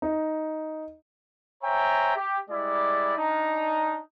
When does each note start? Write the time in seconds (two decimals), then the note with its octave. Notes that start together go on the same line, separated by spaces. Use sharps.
0.02 D#4
1.63 C5 C#5 E5 G5 G#5 A#5
2.15 G4
2.50 G3 G#3 E4 D5
3.17 D4 D#4 A#5